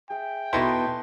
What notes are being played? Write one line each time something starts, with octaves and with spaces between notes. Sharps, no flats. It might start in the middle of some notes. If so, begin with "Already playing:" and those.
G#4 E5 G5
B2 D#4 E4 A4 B4 C6